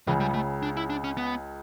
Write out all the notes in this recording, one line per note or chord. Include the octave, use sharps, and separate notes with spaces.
C#2 C#3 E3
G3
A3
D4
E4
D4
C#4
B3